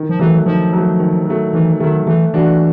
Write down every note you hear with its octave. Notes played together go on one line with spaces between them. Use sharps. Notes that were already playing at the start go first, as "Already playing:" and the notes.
Already playing: D#3
F3
E3 F#3 A3
D#3 F3
F#3 A3
D#3
F#3 A3
D#3 E3
D#3 F#3 A3
E3 A3
E3 D4 F#4